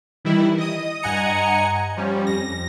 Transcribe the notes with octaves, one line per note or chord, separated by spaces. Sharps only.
D#3 E3 G3 E4
D#5 D#6
G2 D#5 F#5 G#5 A#5 C#7
F3 G3 C#4
F2 A#6